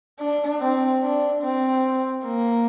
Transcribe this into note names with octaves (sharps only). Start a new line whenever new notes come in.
D4
C4
D4
C4
A#3